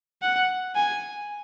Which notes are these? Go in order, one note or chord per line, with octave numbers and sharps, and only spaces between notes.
F#5
G#5